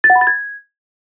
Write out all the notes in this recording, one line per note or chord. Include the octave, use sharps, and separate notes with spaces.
A6
F#5
B5
A6
G#6